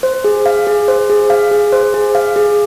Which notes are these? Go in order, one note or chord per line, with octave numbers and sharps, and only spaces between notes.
C5
G#4
F5
G#4
C5
G#4
F5
G#4
C5
G#4
F5
G#4